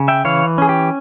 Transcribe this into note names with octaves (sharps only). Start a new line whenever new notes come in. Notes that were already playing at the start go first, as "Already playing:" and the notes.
Already playing: C#3
E5 G5
E3 C#5 F5
C#4 G#4
G4